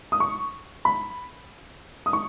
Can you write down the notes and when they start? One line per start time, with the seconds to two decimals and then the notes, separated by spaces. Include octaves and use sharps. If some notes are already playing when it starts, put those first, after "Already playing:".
0.12 D#6
0.20 C#6
0.85 B5
2.06 D#6
2.13 C#6